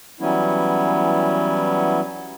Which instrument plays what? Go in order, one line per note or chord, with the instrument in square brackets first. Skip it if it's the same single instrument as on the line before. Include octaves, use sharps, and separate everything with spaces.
[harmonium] E3 F#3 G3 B3 C#4 E4